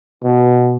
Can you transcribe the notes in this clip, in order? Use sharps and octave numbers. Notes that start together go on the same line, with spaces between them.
B2